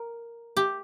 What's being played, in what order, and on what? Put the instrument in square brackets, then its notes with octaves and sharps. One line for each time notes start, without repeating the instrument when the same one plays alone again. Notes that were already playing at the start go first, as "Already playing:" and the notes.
Already playing: [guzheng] A#4
G4